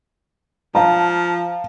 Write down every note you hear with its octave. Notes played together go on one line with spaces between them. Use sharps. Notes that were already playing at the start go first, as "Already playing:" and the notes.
F3 F5 A5 A#5